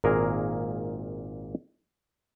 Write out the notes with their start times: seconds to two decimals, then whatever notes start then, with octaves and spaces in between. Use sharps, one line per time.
0.04 G#1 A#2 A#3 G#4 A#4